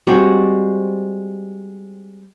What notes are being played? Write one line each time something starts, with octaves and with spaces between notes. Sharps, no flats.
G3 G#3 C4 F#4